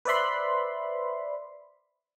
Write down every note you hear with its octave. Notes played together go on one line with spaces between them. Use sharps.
B4 C5 D5 E5 B5 C6